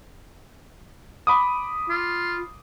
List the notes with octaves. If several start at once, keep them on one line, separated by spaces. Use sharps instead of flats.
B5 D6 D#6
F4